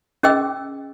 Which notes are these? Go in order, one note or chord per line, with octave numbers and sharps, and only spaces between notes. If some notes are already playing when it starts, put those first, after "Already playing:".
C#4 G#4 D#5 G5 E6